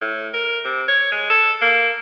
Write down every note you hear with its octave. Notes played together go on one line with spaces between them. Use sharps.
A2
A#4
C3
C#5
G#3
A4
A#3